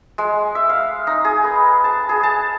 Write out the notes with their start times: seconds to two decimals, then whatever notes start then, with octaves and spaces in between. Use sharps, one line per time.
0.18 G#3
0.55 E5
0.70 F5
1.07 D#4
1.25 G#4
1.44 B4
1.84 A5
2.09 G#4
2.23 A5